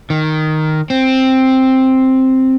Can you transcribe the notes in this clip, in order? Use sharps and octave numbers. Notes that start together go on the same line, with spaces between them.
D#3
C4